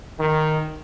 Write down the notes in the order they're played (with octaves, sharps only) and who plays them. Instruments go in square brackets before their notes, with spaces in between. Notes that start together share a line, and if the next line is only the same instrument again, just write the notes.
[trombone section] D#3